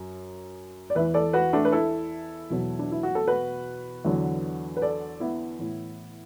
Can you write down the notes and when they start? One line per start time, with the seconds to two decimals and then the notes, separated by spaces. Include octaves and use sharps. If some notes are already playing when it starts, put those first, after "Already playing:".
Already playing: F#2
0.90 D5
0.95 E2 E3 B4 E5
1.14 A4 D5
1.33 F#4 B4
1.53 A3 D4
1.65 B4
1.72 E4 A4
2.50 E2 B2 F#3
2.79 D4
2.91 E4
3.03 F#4
3.15 A4
3.27 F#4 B4
4.05 E2 D3 F#3
4.77 B4
4.82 A4 D5
5.20 B3 E4
5.59 A2 E3